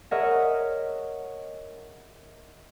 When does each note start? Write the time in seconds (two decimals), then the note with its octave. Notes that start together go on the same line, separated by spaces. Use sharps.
0.11 G#4 A#4 C#5 D#5 E5 F#5